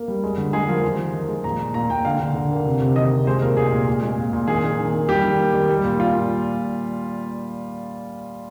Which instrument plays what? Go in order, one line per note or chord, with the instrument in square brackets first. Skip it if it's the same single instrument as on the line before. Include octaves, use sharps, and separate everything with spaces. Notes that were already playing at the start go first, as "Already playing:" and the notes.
Already playing: [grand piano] A#3
G3
G#3
D3
G#3 G#4
F3 A#4
D#3
D#3
D#3
G#3
A#2 A#5
A#2
A#2 A#5
A#2 G5
D3 F5
D3
D3
A#3
C3
C3
D#3 D#5
C3
G#3 C5
A#2 A#4
A#2 G#4
A#2
A#2
G#3
A#2
A#2
D#3 G#4
D#3
D#3
D#3
G3 G4
D#3
A#3
D#3
G3
A#2
A#2 F4